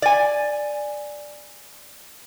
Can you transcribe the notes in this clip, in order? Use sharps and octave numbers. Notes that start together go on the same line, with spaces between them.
D5 G#5